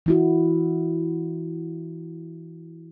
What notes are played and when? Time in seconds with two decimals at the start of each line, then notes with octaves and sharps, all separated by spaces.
0.06 E3 E4 F#4